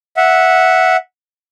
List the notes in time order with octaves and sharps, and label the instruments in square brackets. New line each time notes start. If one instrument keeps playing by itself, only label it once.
[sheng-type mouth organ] E5 F#5